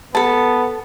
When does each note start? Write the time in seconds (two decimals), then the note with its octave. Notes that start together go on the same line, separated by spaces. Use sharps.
0.15 B3 A4 A5